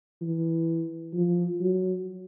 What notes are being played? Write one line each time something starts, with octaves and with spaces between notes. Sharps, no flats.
E3
F3
F#3